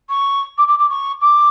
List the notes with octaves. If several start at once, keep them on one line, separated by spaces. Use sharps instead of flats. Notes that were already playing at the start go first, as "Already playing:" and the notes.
C#6
D6
D6
D6
C#6
D6